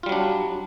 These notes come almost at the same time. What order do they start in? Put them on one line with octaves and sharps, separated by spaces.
F4 G3 F#3 D4